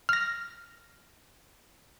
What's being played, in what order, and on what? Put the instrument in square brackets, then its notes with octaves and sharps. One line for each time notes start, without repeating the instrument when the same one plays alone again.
[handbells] F6 A#6